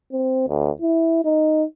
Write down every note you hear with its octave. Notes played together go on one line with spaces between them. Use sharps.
C4
D2
E4
D#4